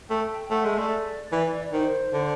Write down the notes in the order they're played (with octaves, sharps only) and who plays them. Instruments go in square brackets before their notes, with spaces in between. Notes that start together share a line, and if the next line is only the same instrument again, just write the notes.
[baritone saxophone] A3 [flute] G5
[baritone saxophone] A3 [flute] F#5
[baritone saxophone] G#3 [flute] E5
[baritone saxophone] A3 [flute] D5
[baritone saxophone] E3
[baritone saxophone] D#3 [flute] C5
[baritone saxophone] D3